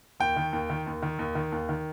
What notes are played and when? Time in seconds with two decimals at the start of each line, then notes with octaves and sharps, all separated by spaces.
0.20 D#2 G5
0.36 D#3
0.53 D#2
0.70 D#3
0.87 D#2
1.03 D#3
1.19 D#2
1.35 D#3
1.52 D#2
1.69 D#3